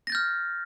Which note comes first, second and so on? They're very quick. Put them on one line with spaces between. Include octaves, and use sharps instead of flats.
A#6 A6 G6 F6